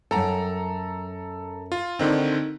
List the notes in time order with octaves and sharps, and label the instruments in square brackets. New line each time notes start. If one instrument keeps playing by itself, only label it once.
[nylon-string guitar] F#2 F#5 G5 [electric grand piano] A4 A#5
[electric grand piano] F4
[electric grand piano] D3 D#3 C4 [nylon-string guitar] D#4